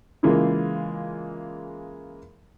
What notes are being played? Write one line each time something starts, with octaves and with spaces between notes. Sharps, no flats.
C#3 E3 G#3 A#3 F4